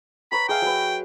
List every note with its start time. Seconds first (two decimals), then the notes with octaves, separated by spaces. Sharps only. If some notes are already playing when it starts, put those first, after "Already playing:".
0.32 B4 C#5 A#5 B5
0.49 G#4 E5 F5 G5
0.62 F#3 B4